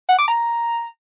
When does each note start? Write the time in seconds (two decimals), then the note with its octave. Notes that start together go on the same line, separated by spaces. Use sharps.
0.09 F#5
0.18 D6
0.28 A#5